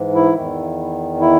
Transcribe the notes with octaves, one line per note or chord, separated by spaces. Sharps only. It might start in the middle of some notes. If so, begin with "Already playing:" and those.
Already playing: G#2 E3
E4
E2 D#3
E4